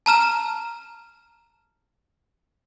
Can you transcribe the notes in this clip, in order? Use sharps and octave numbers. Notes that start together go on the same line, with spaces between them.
A5 A#5 F6 E7